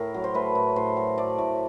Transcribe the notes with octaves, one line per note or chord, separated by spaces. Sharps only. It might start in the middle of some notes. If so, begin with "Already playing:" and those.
Already playing: A2 A#4
F#3
C5
A3 B4
A2
A2 C5
F#3
A3 D5
A2